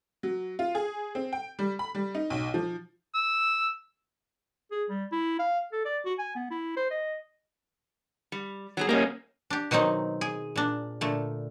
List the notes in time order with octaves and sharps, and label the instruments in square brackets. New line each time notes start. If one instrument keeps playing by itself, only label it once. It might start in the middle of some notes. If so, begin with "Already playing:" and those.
[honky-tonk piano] F#3
F4
G#4
C4
G5
G3
B5
G3
D#4
B1
F3
[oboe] E6
[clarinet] G#4
G3
E4
F5
A4
D5
F#4
G#5
B3
E4
C5
D#5
[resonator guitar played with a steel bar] G3
F#3 B3 G#4
[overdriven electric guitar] A#3 C#4 [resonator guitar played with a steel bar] G4 D#5
[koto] D4 G4
B2 D#3 F#3 C4 D#4
G#4
A#2 D4
A#2 D3 A3